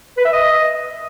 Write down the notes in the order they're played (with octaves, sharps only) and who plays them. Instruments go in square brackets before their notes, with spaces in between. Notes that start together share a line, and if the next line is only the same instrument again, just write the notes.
[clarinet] B4
E5
D#5